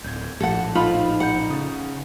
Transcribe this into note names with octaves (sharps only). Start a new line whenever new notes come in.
D1 G6 G#6
A#1 A2 A4 F#5 A#6
D#4 F4 A4 C5 B5
F#5 A#5 G6
C#3 D#6 A6